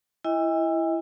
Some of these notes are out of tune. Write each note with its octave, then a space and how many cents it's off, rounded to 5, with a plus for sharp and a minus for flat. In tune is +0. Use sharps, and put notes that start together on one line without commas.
E4 +15 D#5 +40 G#5 -45